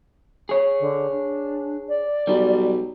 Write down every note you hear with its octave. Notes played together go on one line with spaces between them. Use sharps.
G#4 C#5
D3
D4
D5
B1 G3